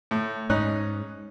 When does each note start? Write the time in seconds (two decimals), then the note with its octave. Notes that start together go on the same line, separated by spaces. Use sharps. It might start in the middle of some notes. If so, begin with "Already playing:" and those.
0.11 A2
0.50 G#2 C#4 D#4 F#6